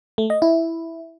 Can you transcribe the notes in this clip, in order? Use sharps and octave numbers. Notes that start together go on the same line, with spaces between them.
A3
D#5
E4